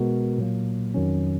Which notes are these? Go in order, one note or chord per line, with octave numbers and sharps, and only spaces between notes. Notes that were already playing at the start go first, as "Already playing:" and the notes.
Already playing: B2 G#3 B3 F#4 A#4
A#2 F#3 A#3
F2 D#3 F#3 C#4